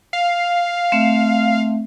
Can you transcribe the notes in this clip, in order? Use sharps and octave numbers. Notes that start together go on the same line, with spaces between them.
F5
A3 C4 E5